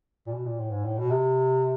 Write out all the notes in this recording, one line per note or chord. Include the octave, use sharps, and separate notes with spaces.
A#2
B2
A#2
A2
G#2
A2
B2
C3